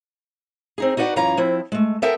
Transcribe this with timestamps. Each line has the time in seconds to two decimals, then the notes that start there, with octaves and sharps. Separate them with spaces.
0.78 C4 D#4 G#4
0.97 D#4 F#4 B4 D5 F#5
1.16 F#2 E3 C#4 F4 F5 A#5
1.37 F3 C4 E4
1.72 G#3 A3
2.02 B3 A4 A#4 E5 G5 A5